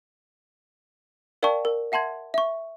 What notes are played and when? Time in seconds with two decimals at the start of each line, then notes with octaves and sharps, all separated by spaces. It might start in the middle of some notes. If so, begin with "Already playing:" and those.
1.43 A#4 D5 F5 G5 A5 C#6
1.65 A#4
1.92 E5 F#5 A5 C6 G#6
2.34 E5 C#6